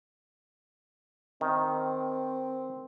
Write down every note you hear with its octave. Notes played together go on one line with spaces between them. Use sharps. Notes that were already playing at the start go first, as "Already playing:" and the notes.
D#3 C4